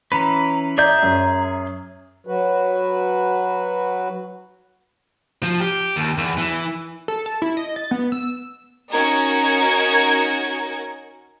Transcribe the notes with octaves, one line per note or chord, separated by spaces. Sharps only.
E3 C#4 B4 A#5
G#4 D5 E5 A#5 G6
F#2
F#3 F#4 B4
F3
G4
D#2
E2
E3
A4
A5
E4
D#5
A6
B3
E6
C#4 D#4 F#4 A#4 G#6